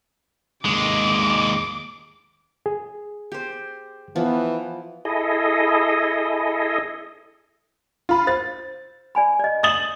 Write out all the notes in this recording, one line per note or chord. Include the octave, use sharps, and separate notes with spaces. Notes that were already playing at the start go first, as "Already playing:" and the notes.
D#2 G#3 D6
G#4
G4 C5
E3 F3 B3
E4 G#4 A4 D#5
F4 B5
C5 A6
D5 G#5 B5
D5 D#5
D#6 A6 F#7